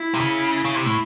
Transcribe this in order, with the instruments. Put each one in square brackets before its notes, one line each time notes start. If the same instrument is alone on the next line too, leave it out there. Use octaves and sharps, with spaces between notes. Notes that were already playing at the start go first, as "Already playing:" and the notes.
Already playing: [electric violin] E4
[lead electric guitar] C3
C#3
C#3
C3
A2